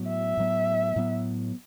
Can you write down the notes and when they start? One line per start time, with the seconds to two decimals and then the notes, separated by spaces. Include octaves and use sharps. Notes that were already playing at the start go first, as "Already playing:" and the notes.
Already playing: A2 F#3 B3
0.08 E5
0.37 A2 F#3 B3
0.96 A2 F#3 B3